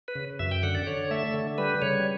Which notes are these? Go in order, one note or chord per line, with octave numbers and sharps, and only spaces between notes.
B4
C#3
F#2 E5
G5
D3 F#5
D5
D3 C#5
A3 E5
D3
G3 B4
C#3 C#5